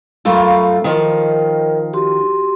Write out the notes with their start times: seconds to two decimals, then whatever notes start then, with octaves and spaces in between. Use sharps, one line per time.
0.25 F#2 A3 F4 F5 B5 C#6
0.84 D#3 F3 A#4 D#5 G5
1.94 F#4 G4 C6